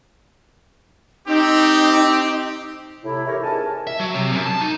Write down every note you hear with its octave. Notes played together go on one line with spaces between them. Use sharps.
C4 D#4 G4
A2 C3 E4
E3 E4 G4 A#4 C#5
C#2 G#2 A#4 G#5 A5
E5
F#3
C3
F#2
A5
D#4